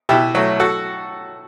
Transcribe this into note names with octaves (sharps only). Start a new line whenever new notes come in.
B2 E4 G4
F#3 A3
F#4 A4